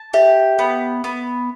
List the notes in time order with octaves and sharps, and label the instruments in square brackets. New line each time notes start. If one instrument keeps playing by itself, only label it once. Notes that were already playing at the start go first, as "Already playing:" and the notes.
Already playing: [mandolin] A5
[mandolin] G4 [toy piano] E5
[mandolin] B3
B3